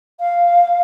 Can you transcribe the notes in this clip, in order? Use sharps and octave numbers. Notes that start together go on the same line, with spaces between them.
F5